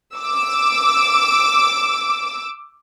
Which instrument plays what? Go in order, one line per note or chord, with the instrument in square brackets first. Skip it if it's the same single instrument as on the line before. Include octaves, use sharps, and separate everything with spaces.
[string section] D6 E6